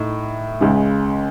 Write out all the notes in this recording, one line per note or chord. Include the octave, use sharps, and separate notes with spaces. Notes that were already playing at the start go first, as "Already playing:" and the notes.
Already playing: A2 D#4
C#2 C#3 G#3